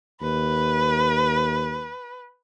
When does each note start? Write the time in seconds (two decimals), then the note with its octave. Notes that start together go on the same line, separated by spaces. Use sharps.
0.21 D#2 B4